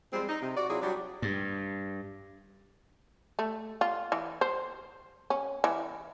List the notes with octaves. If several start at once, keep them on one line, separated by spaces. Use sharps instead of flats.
F3 G3 G#3 C4
D#4
C3
F#4 D5
F#3 C4 E4 F4 G#4
F#3 G3 D4 F#4 G4
G2
A3
F4
E3
C5
C#4
E3